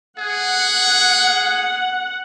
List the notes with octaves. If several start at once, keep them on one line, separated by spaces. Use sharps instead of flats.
G#4 F#5